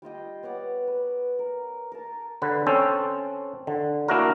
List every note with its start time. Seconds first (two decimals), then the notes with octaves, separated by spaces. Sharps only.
0.02 G3 F4 D#5 G5
0.43 B3 C#5 D5 F#5
0.87 B4
1.39 A#4
1.92 A#4 A5
2.42 D3 B4
2.67 C4 C#4 A4 C5
3.67 D3
4.08 A#3 D4 E4 F#4 A#4